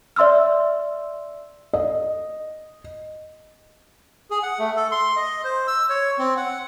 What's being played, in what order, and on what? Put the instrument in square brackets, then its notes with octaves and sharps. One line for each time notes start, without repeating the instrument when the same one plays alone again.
[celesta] D5 E5 C6 E6 F6
[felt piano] D#5
[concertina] G#4
F#5
A3
A4
C6
D#5
C5
E6
C#5
C4
F#5